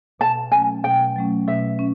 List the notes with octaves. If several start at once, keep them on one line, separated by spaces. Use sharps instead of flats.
B2 A5
F#3 A3 C#4 G#5
B2 G5
F#3 A3 C#4
B2 E5
C#4